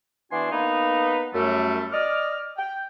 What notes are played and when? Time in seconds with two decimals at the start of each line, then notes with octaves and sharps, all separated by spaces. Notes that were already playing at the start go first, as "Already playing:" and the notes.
0.31 E3 B3 D4 F#4 G#5 C6
0.51 A#3 B3 D#4 B4
1.34 F#2 G3 A3
1.92 D5 D#5 D6 F6
2.57 G5